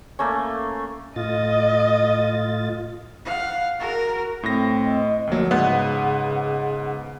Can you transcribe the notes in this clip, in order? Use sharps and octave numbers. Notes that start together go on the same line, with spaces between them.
A3 A#3 C#4
A2 F4 D#5 A6
F5 F#5
F#4 A#4
A2 C4 A#6
D#5
D2 F3 F#3 A#3
G#2 C#3 B3 F#5